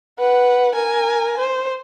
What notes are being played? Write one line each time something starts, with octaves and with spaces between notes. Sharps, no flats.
B4 F#5
A#4 G#5
C5